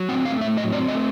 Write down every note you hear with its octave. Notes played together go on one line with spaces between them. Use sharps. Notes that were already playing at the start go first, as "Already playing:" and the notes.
Already playing: F#3
C4 F#5
A3 F5
A2 E5
F#3 D#5
C4 D5
A3 D#5